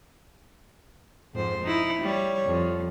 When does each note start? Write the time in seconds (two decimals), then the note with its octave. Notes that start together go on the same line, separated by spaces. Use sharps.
1.34 F2 G#2 C5
1.63 D#4 E4
2.01 G3 C#5
2.45 F2